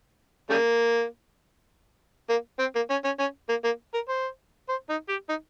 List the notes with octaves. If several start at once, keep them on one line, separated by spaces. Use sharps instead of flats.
C#3 G3 A#3
A#3
C4
A#3
C#4
C#4
C#4
A#3
A#3
A#4
C5
C5
D#4
G4
D#4